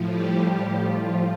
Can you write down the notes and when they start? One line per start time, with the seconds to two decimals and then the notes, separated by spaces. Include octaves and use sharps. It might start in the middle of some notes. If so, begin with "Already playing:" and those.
Already playing: A2 F3
0.09 G3 G4
0.45 G3 G4
0.82 F3 F4